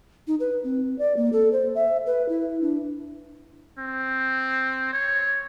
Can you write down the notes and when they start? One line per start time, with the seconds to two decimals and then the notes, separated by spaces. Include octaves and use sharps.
0.27 D#4
0.40 B4
0.64 C4
0.99 D5
1.17 A#3
1.33 A4
1.52 C5
1.75 E5
2.06 B4
2.29 E4
2.61 D4
3.78 C4
4.93 C#5